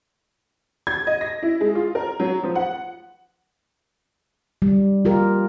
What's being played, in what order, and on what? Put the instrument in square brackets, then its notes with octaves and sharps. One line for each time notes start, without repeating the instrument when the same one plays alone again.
[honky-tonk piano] G#6
D#5
A#6
E4
G#3
F4
A#4
F#3
F3
F#5
[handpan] G3
F4 G4 A#4